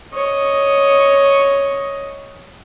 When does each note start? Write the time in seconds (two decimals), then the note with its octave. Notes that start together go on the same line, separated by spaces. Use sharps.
0.13 C#5 D#5